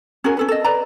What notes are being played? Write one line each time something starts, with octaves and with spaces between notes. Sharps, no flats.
C#4 F#4 G#4 A#4
C#4 A4 B4
A4 D#5
B4 D5 A#5